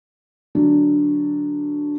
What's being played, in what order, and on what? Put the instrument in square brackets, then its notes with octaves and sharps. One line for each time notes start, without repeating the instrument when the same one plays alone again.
[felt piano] D3 F#3 D4